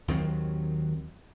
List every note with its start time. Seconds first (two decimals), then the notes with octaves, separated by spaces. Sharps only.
0.08 D#2 D#3 F#3 C4